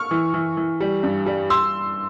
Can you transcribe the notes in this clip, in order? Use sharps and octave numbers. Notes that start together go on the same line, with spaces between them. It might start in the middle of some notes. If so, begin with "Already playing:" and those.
Already playing: C#6 F6
E3
E3
E3
G3
G2
G3
C6 E6